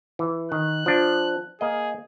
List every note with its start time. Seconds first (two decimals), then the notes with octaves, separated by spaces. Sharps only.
0.19 E3
0.52 D#3 F#6
0.86 F3 D4
1.61 A#3 G#4 D#5